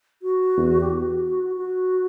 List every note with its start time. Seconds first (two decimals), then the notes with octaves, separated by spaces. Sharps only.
0.22 F#4
0.57 E2
0.81 G4
0.90 F#4
1.56 F#4